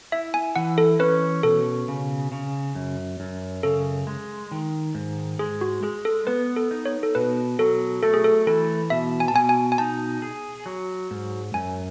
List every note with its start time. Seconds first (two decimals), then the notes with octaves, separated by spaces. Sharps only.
0.12 E4 E5
0.34 G#5
0.56 E3 F#5
0.78 A4
0.99 C#4 B4
1.43 B2 A4
1.88 C#3
2.32 C#3
2.75 F#2
3.20 F#2
3.63 C#3 A4
4.07 G#3
4.51 D#3
4.95 G#2
5.39 G#3 G#4
5.61 F#4
5.83 G#3 G#4
6.05 A4
6.27 B3 B4
6.56 A4
6.71 D#4
6.86 C#5
7.03 A4
7.15 B2 B4
7.59 F#3 A4
8.03 A3 A4
8.14 G#4
8.24 A4
8.47 E3 A4
8.90 B2 E5
9.20 G#5
9.28 A5
9.34 B2 G#5
9.49 G#5
9.72 G#5
9.78 D#4 A5
10.22 G#4
10.66 F#3
11.11 G#2
11.54 F#2 G#5